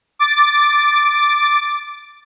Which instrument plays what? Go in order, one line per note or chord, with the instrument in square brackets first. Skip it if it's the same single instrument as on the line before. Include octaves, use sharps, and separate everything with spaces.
[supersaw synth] D6 A6